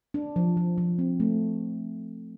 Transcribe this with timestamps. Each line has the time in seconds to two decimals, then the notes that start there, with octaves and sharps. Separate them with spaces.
0.14 D4
0.36 F3
0.57 F3
0.78 F3
0.99 C4
1.20 A3